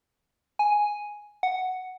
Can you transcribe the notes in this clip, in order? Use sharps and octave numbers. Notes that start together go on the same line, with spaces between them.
G#5
F#5